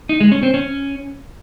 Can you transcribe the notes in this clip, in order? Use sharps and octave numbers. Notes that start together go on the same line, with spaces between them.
D#4
G#3
C#4
C4
C#4